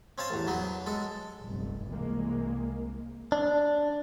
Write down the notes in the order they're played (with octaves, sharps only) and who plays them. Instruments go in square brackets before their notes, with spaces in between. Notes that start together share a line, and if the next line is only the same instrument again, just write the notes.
[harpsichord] C4 C#4 F5 A5
A1 E2
B2 F#3 B3
G#3 A4
[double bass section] F1 B1 G2
C2 E3 G#3 A#3
[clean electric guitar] D4